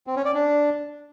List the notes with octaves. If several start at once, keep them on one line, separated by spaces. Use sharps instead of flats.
C4
C#4
D5
D4